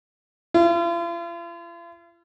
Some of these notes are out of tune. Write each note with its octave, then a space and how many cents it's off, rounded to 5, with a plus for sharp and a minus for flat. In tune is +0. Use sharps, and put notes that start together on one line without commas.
F4 -45